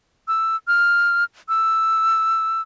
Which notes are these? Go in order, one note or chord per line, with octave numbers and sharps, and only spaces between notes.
E6
F6
E6